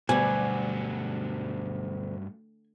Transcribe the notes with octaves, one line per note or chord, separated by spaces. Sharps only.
D2 G2 B2 F#3 G3 G#5